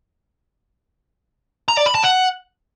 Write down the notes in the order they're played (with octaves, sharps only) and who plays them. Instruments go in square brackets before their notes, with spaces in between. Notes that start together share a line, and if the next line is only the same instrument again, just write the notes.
[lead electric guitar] A#5
D5
B5
A5
F#5